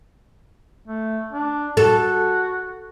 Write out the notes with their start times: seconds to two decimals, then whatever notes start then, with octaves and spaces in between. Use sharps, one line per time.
0.88 A3
1.32 D4
1.77 F#4 A4